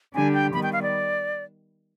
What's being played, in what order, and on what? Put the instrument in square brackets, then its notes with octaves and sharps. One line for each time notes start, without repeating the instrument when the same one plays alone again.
[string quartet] D3 G3 D4 G4 [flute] G#5
[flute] G5
[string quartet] D#3 G3 B3 [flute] B5
[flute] G5
F5
D5